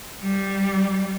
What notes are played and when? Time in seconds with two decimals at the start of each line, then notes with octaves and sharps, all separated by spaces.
0.23 G3